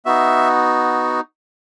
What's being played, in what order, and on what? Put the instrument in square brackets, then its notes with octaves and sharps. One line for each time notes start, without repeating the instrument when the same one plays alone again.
[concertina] B3 D#4 F#4 E5